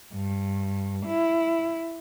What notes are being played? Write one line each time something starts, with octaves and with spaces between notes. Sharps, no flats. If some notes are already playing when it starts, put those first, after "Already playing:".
G2
E4